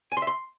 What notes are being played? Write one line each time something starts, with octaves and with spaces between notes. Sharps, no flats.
G#5
C6
E5
C6